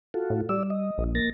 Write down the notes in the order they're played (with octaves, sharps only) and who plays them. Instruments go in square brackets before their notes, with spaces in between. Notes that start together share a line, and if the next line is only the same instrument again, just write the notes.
[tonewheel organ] F4 F#4 A4
[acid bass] A2
[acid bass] G3 [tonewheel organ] D5 E6
[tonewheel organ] D#5
[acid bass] A#1
[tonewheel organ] A#3 A6 A#6